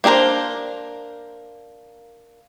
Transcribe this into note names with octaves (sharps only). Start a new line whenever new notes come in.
A#3 D4 G#4 A#4 C5